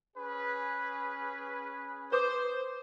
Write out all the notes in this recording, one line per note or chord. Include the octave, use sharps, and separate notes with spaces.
C#4 G#4 B4
B4 C5 D6 D#6